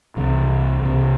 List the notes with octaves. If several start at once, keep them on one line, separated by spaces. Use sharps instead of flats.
C2 C3 E3
C2 C3